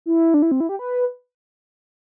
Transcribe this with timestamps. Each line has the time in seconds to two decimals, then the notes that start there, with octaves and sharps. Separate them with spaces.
0.06 E4
0.34 D4
0.42 E4
0.52 C4
0.60 E4
0.69 G4
0.79 B4